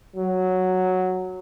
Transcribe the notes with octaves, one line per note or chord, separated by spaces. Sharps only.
F#3